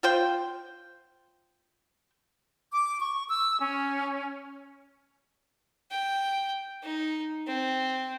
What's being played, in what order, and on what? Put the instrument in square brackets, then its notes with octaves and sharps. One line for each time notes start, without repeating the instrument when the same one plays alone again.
[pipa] F4 C5 G5
[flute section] D6
C#6
E6
C#4
[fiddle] G5
D#4
C4